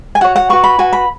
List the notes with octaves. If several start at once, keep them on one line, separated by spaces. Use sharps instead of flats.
G#5
F#4 C#5 F#5
F#5
F#4 B4 C#6
B5
F#4 B4 G#5
B5